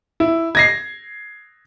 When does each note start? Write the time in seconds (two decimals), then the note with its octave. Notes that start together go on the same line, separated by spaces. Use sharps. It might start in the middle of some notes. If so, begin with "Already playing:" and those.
0.20 E4
0.55 G#6 A#6 C7